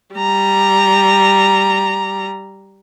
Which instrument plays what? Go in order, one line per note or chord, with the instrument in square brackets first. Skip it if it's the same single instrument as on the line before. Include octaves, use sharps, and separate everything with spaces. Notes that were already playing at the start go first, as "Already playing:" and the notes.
[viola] G3 A#5